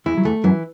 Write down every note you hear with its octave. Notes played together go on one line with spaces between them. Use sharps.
E2 E3 E4
F#3
E2 E3 A3
F#2 E3 F#3